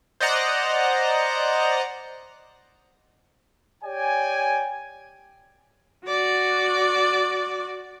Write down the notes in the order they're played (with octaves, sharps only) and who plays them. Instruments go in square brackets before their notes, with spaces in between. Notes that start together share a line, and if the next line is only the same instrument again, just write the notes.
[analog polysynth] C5 D5 D#5 F#5 A#5
[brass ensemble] G4 C#5 D5 G5 G#5
[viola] F#4 D5